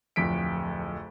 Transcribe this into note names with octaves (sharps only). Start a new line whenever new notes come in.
D1 F2 B6 D7